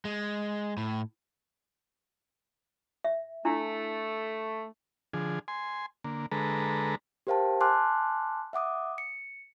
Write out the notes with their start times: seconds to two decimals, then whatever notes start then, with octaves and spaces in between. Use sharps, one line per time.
0.05 G#3
0.77 A2
3.04 E5
3.45 A3 D4 E4
5.13 D3 F3 G#4
5.48 G#5 C6
6.04 D3 A#3
6.32 D3 G#3 A4 B4 A#5
7.27 G4 A#4 C5 F5 G5 A5
7.61 G#5 A5 C6 D6 F6 F#6
8.53 E5 F#5 D6 D#6
8.98 C#7